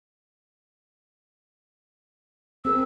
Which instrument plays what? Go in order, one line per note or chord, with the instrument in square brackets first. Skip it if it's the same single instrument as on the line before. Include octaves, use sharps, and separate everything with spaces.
[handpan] C4 G#4 A#4 [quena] E6